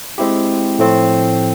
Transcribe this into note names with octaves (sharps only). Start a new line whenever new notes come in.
G#3 C4 E4 G4
A2 F3 A3 C4